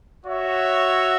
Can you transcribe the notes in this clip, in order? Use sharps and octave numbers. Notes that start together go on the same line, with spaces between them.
F#4 C#5 E5